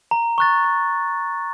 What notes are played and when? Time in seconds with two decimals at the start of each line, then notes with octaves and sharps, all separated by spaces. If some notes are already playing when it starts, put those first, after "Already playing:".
0.11 A#5
0.38 C#6 F#6 A6
0.65 A#5